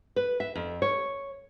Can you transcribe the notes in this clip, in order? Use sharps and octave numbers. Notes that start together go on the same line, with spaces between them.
B4
E5
F2
C#5